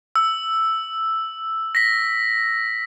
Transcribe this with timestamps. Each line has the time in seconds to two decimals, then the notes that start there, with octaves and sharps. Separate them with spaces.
0.16 E6
1.75 A#6 B6